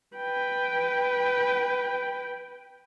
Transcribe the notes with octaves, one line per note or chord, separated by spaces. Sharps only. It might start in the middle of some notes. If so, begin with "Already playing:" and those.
B4 G5